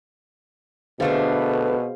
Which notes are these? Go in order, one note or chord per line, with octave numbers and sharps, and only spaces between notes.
B2 D3 A3 D4 G#4 B4 C5 F5